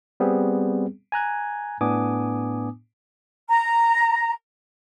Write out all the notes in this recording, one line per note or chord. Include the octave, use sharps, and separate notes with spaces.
G3 B3 C4 G#4
G#5 A#5 F#6 G#6
A2 B3 D4 G#5 D6 D#6
A#5